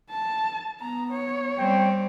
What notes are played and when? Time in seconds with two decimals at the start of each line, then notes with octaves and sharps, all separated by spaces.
0.10 A5
0.80 B3 A#5
1.11 C#5
1.58 G3 C4 G5